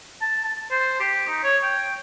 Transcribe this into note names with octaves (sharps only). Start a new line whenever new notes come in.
A5
A5
C5
G4
D#4
C#5
G5